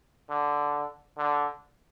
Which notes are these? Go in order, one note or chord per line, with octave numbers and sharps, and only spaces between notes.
D3
D3